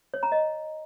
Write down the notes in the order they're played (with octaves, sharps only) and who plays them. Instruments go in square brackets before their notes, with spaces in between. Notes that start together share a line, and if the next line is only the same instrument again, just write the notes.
[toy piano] C#5
A#5
D#5